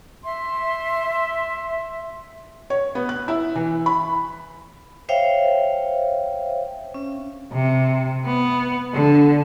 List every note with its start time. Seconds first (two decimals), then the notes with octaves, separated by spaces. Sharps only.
0.24 E5 C6
2.70 C#5
2.95 B3
3.09 F#6
3.28 E4
3.56 E3
3.86 B5
5.09 C5 C#5 E5 F5 G5
6.94 C#4
7.53 C3
8.25 B3
8.93 D3